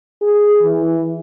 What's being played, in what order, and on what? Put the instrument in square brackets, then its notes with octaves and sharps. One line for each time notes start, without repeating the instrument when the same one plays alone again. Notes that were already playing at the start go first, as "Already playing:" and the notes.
[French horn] G#4
E3